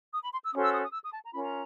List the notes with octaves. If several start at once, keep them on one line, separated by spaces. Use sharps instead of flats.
D#6
B5
C6
E6
C#4 F#4 A4 C5 D#6
E6
D#6
D#6
E6
D#6
A5
A#5
C#4 F4 A#4 B5
A#5